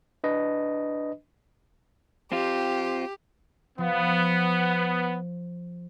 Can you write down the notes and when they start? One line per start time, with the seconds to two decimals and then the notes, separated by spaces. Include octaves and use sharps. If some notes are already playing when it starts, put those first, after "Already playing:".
0.24 D4 B4 D#5
2.32 C4 F4 G4
3.78 F3 B3